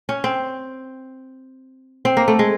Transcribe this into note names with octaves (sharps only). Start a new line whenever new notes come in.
C#4
C4
C4
A#3
A3
G#3